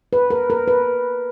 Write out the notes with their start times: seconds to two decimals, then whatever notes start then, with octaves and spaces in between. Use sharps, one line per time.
0.13 B4
0.30 A#4
0.50 A#4
0.68 B4